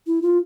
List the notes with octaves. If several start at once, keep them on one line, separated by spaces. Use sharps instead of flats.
E4
F4